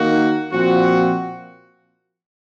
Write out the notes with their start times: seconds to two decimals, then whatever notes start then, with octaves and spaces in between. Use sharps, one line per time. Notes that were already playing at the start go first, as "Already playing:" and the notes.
Already playing: D#3 A#3 D#4 F#4
0.52 A#2 F3 C4 F#4